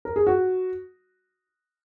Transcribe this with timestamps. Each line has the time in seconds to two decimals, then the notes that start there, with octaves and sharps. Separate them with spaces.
0.05 A#4
0.16 G#4
0.27 F#4